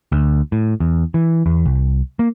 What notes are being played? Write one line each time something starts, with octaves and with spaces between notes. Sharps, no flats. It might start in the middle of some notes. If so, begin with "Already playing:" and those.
D2
A2
E2
E3
E2
C2
A#3